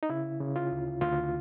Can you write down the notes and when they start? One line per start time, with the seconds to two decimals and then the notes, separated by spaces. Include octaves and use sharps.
0.03 D#4
0.09 C#3 E4
0.40 C#3
0.56 F4
0.71 D2
1.01 D2 F4